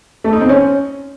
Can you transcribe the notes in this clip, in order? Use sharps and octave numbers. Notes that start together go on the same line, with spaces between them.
A3
D#4
C4
C#4